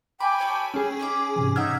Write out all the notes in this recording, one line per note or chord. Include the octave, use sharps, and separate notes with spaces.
G5 G#5 B5 D6
F#4 A4 C#5
C#4 G#4 G#5
D#4 B5 D6
G#2 C3 E3
D#4 E5 F#5 G5 E6 F6 G#6